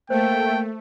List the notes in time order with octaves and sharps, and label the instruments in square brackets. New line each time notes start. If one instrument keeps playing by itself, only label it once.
[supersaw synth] A3 [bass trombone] A#3 [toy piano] C5 [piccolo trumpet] G5